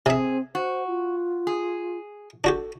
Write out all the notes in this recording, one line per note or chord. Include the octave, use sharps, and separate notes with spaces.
C3 C4 G#4 E5
F#4 C5
F4
G#4
D4 F#4 G4 A4